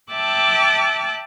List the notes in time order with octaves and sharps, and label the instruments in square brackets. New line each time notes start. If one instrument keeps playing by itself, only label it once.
[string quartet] E5 G5 A5 D6 E6 F#6